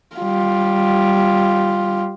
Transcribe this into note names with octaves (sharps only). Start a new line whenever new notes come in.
G3 F4